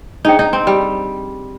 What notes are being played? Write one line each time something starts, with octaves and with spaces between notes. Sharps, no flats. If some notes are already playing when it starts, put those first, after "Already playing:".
D4 D#4 G#4 C5 G5
D#4
C4
G3